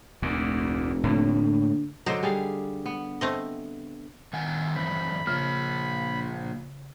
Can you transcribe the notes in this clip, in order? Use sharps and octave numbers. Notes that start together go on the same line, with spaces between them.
F1 D2 A#2
A2 D3 A#3
D3 F#3 D#4 C5
G3 G#4 F5
B3
A3 C4 D#5
D#3 F#5 G#5
F#2 E3 C4 B5
C#3 F3 A#3